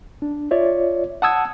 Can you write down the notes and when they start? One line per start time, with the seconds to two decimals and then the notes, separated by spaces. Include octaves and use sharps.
0.22 D4
0.51 F4 C#5 D5 E5
1.22 F#5 A5 D#6 E6 G#6